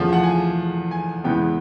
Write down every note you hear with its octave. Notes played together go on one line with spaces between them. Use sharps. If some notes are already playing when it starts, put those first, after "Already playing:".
Already playing: E2 C#3 F3 A3
F#5
G#5
G#5
E2 C#3 E3 G#3 B3 G5